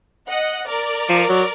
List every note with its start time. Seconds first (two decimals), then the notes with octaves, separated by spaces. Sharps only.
0.28 D#5 F#5
0.68 A#4 D5
1.09 F3
1.29 F#3